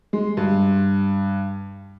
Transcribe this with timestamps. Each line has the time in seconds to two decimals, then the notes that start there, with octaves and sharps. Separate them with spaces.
0.13 G#3
0.37 G2